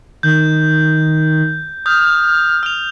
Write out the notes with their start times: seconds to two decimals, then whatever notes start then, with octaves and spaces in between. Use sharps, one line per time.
0.23 D#3 G6
1.86 D#6 F6 G6
2.63 F6 F7